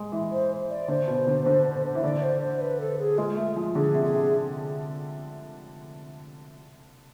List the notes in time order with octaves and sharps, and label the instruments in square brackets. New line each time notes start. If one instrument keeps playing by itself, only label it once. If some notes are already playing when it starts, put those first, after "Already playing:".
Already playing: [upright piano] G#3
E3
[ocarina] C5
D5
[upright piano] D3 [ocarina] C5
[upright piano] B2
D3
D3
E3
[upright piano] D3 [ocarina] D5
[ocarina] C5
C5
B4
A4
G#4
[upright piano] G#3 [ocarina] F4
[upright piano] A3
F3
[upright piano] D3 [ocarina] G#4
[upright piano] C3
[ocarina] G#4
[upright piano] C3